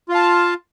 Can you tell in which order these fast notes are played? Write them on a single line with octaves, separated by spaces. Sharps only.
F4 F5 A5